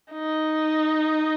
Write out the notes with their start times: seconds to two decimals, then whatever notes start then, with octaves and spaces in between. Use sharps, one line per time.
0.12 D#4